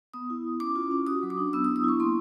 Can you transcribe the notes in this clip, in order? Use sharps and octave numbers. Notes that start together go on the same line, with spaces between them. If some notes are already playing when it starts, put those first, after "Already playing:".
B3 D#6
E4
E4
C#4 D6
F4
C#4
F#4 D#6
F#3
D6
D4
B3 E6
D#6
E4
D#6
E4 C#6
A#3 C6